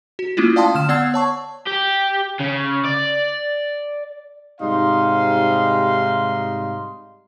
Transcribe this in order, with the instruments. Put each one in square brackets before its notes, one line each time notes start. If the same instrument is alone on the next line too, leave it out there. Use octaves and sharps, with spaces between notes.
[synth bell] F#4
A3 A#3 C#4 E4 F4
D5 F5 G5 A5 C6 D#6
D3 F6 E7
B3 D5 F#5 E6 G#6 C7
C#5 A5 C#6
[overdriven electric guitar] G4
C#3
D5
[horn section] G#2 C3 G3 D#4 F5 C6